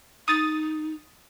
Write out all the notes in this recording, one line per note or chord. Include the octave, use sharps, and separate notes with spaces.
D#4 D#6 A6